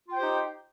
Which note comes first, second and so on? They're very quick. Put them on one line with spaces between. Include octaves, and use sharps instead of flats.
F4 G5 C5 G4 D#4